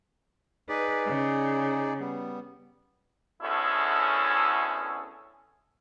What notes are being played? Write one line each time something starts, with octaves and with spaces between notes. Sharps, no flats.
D#4 G#4 B4 D5
C#3
G3 B3
D2 B2 C#4 E4 G#4 A4